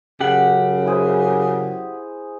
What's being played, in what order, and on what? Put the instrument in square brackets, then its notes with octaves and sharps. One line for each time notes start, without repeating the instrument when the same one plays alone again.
[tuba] F#2 [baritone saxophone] C#3 [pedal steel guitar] G4 F#5
[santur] E4 G#4 C5